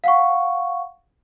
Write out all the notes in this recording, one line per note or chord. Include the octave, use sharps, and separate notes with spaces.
F5 F#5 C#6